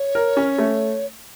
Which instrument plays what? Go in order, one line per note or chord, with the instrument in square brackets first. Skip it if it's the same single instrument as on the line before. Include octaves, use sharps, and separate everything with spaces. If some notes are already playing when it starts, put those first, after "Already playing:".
Already playing: [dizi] C#5
[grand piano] A#4
C#4
A3